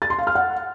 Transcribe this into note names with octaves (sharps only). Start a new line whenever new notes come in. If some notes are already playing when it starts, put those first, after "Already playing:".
A6
C6
F5
F6
F#5